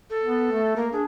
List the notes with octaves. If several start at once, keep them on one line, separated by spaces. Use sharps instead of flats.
A4
B3
A3
A#3 A#4
D4 G#4